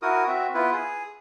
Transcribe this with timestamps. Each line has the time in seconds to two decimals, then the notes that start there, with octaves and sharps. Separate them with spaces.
0.02 E4 F#4 A#4 D#6
0.27 C4 F#4 E5
0.54 B3 E4 F4 B4
0.72 G#4 D#6